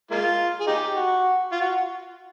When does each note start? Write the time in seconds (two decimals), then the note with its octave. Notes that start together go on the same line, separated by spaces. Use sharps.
0.11 G#3 A#3 F4
0.60 G#4
0.67 D#4 G4
0.96 F#4
1.52 F4
1.61 F#4